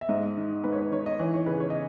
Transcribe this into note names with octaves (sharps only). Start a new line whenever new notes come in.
E5
G#2 D#5
D#3
G#2 B4
C#5
B4
D#3 C#5
D#5
E3 C#5
C#5
C#3 B4
C#5
D#5